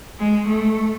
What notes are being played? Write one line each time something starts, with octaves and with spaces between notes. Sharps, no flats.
G#3
A3